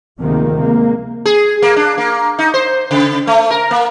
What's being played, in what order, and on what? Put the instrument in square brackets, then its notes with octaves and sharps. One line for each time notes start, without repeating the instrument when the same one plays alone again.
[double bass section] D2 C3 D#3 F3 G#3 A#3
C3 G#3 A#3
[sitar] G#4
A#3
D4
A#3
D#4
C5
C#3
A3
A#4
A#3